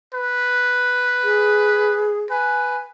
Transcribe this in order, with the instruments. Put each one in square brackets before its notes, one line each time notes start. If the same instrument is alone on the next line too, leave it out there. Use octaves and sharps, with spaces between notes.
[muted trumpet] B4
[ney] G#4
[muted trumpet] B4 [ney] G#5